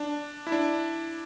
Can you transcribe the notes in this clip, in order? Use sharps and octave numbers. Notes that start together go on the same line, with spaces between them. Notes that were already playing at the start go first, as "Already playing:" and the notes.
Already playing: D4
E4
D4